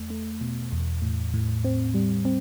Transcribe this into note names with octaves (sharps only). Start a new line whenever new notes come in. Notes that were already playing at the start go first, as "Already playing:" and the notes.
Already playing: E2 A3
A3
B2
E2
A2
A2
C4
G3
C4